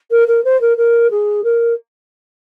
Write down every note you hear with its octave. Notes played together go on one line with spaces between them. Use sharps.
A#4
A#4
C5
A#4
A#4
G#4
A#4